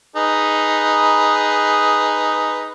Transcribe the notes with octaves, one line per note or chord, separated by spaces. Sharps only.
D#4 G#4 B4